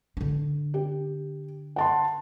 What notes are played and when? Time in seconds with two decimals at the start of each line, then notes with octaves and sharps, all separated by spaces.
0.17 D3 D4
0.74 G4
1.76 F#5 A5 C6